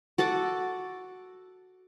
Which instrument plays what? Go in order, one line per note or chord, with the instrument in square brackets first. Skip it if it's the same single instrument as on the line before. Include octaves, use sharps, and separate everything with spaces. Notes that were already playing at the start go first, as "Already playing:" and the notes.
[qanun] F#4 A4 F#5 D6